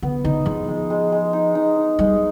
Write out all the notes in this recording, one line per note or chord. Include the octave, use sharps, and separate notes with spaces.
D3 B3
D3 D#4
F3 G#3
G#3
G#3
G#3
D#4
D#4
D#4
G3 G#3